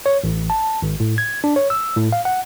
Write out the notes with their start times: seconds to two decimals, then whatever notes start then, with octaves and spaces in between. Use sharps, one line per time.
0.06 C#5
0.24 A1
0.50 A5
0.82 G#1
1.00 A2
1.18 G#6
1.44 D4
1.56 C#5
1.70 E6
1.96 A2
2.12 F5
2.25 F#5